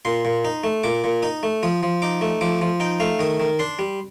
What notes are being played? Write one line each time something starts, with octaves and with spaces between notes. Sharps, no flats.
A#2 C6
A#2
D#4
A3
A#2 D6
A#2
D#4 D#6
A3
F3 D#6
F3
D#4 D6
A3
F3 D6
F3
D#4 G5
A3 F5
D#3 D#6
D#3
D4 C6
G3